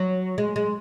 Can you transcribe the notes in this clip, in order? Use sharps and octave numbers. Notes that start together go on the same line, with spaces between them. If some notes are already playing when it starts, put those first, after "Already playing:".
Already playing: F#3
G#3
G#3